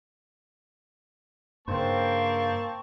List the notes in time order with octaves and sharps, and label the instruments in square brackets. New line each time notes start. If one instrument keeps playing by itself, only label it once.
[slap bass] G2 C#3 [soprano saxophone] A#3 [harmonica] C4 A5 C#6 [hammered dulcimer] C5 G5